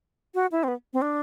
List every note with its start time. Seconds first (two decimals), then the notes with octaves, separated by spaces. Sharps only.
0.35 F#4
0.52 E4
0.64 C4
0.68 B3
0.93 C4
1.02 D4